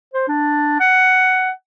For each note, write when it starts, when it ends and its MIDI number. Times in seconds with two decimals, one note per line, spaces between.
0.14 0.24 72
0.28 0.79 62
0.80 1.51 78